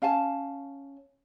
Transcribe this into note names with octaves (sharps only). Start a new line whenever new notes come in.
C#4 F5 G#5 A5